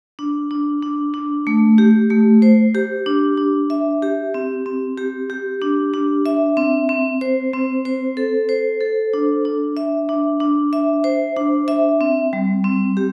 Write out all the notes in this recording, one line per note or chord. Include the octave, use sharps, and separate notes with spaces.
D4
D4
D4
D4
A3
G4
A3
C5
G4
D4
D4
E5
G4
C4
C4
G4
G4
D4
D4
E5
C4
C4
C5
C4
C5
A4
C5
A4
D4
D4
E5
D4
D4
E5
C5
D4
E5
C4
G3
C4
G4